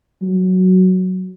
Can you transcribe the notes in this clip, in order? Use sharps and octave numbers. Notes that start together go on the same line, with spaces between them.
F#3